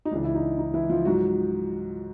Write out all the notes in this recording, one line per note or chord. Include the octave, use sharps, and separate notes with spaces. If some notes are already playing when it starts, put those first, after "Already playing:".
D#4
C#2 C#3 E3 D4
E4
D#4
D#4
E3 E4
F3 F4
G#2 F3 F#3 F#4